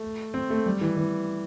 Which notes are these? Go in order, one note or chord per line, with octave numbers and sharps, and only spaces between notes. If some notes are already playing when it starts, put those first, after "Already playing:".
Already playing: A3
C4
A3
G3
E3
E3